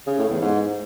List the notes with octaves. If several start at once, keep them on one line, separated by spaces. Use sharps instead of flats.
C#3
A2
E2
G#2